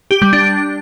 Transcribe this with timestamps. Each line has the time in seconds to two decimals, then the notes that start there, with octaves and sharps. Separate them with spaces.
0.11 G4
0.22 G3
0.33 D4